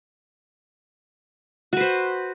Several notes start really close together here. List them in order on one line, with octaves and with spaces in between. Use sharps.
F#4 B4 C5